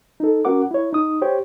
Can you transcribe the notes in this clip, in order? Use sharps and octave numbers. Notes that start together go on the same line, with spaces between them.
D#4 A4
C#4 F#4 A#4 F#5 D6
E4 C#5
D#4 D#6
G4 C5 C#5 G5